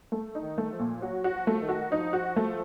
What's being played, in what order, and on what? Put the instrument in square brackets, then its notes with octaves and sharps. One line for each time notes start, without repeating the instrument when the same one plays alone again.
[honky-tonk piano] A3
D#4
[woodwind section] D#3
[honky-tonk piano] A3
[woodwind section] F3
[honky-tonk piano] A#2
[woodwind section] F#3 [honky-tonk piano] F#4
[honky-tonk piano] F#4
[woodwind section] F3
[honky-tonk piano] A3
[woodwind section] D#3
[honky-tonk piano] F#4
[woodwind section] F3 [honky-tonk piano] D#4
[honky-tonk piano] F#4
A3